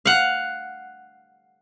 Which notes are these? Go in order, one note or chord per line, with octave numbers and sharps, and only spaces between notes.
F5 F#5